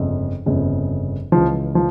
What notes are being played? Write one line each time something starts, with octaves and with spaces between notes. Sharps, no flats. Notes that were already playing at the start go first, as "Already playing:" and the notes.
Already playing: G1 F2 C#3
G1 F2 C#3
C#2 C#3 E3 F3
F3